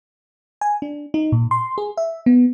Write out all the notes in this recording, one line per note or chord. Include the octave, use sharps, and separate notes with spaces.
G#5
D4
D#4
A#2
C6
G#4
E5
B3